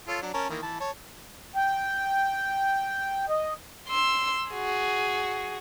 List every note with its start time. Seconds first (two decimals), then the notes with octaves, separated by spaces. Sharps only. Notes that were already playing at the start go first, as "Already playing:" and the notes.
0.08 F4 A4 C#5
0.22 F#3 D4
0.34 C#4 A#4 A5
0.49 D#3 E3 A#3
0.62 E3 A5
0.80 C#5 A5
1.56 G5
3.29 D#5
3.89 C6 E6
4.52 F#4 G#4